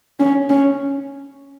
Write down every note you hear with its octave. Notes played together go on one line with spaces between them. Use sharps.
C#4
C#4